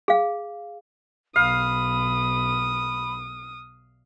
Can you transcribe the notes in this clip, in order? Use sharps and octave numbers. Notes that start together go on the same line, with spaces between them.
G#4 F5
B1 F5 B5 D#6